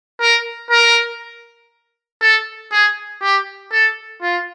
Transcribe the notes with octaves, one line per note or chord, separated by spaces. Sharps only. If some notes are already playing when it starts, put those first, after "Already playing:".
A#4
A#4
A4
G#4
G4
A4
F4